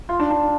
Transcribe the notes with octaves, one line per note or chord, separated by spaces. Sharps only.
F4
D4
D4